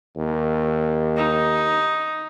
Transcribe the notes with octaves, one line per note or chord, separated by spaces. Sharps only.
D#2
D#4